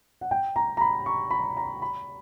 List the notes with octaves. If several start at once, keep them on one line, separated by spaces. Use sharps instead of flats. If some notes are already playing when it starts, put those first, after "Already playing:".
F#5
G5
A#5
A#5
B5
C#6
B5
A#5
B5